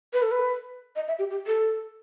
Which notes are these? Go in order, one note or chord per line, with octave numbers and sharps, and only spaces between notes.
B4
A4
B4
D#5
E5
G4
G4
A4